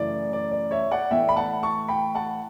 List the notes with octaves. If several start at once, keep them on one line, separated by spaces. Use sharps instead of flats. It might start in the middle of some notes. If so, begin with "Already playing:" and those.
Already playing: F#2 C#3 E3 A3 D5
D5
D5
C#5 E5
D5 F#5
A2 E3 A3 E5 G5
B5
F#5 A5
A5 C#6
G5 B5
F#5 A5